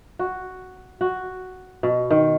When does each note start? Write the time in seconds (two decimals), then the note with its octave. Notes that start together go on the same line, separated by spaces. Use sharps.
0.19 F#4
1.01 F#4
1.83 B2
2.11 D#3